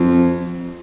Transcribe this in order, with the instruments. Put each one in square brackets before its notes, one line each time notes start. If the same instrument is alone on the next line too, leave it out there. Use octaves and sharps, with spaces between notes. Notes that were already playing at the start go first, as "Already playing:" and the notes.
Already playing: [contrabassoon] F2